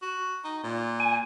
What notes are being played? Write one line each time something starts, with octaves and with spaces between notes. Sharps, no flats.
F#4
D#4
A#2
G#5